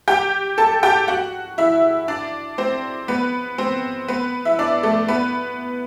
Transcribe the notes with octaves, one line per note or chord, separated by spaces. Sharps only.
G4 G5
A4 A5
G4 G5
F#4 F#5
E4 E5
D4 D5
C4 C5
B3 B4
C4 C5
B3 B4
E4 E5
D4 D5
A3 A4
B3 B4